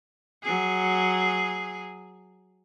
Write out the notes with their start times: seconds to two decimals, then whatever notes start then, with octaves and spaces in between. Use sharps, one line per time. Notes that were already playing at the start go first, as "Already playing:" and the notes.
0.44 F#3 G#4